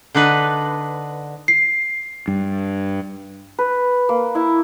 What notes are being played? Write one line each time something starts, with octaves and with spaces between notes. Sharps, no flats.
D3 D4 D#4 B4
C7
G2
B4
A#3
E4